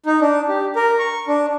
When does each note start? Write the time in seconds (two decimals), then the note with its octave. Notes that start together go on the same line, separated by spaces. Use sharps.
0.06 D#4
0.21 D4
0.49 G4
0.76 A#4
0.99 C#6
1.27 D4